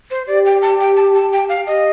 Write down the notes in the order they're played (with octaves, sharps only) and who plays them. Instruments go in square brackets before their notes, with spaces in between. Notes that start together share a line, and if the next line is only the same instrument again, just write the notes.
[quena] C5
[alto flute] G4 [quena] D5
[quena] G5
A5
G5
A5
A5
G5
F5
[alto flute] G4 [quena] D#5